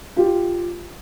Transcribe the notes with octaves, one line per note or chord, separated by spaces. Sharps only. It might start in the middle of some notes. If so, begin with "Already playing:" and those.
F4 G4